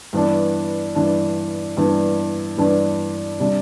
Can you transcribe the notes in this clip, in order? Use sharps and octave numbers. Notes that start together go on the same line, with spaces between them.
G2 E3 B3 D4
G2 E3 B3 D4
G2 E3 B3 D4
G2 E3 B3 D4
C3 G3 D4